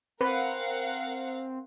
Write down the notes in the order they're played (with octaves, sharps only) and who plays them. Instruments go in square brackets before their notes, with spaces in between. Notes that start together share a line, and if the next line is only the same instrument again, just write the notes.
[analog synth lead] C4 [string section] A#4 F5 F#5 [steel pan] B4